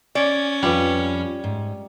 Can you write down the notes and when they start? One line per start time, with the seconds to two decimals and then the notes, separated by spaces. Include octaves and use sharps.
0.15 C#4 D5
0.63 F2 G3 F4 B4
1.44 G#2